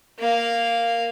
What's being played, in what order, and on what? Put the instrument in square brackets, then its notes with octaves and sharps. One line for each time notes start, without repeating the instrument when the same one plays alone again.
[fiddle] A#3 F5